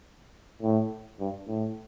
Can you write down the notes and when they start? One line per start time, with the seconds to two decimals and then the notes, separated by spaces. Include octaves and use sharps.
0.62 A2
1.20 G2
1.48 A2